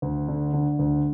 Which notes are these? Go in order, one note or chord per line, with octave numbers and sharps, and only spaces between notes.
D2
D3
D3
D2